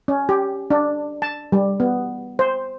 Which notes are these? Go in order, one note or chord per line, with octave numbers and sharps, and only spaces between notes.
C#4
G4
D4
A5
G3
B3
C5